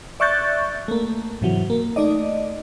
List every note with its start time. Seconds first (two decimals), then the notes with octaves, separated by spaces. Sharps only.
0.20 D5 E5 C#6 F#6 G6 A6
0.88 A3 A#3
1.41 G#2 C3 E3 F#3
1.70 A#3
1.96 A3 D#4 D5 D#5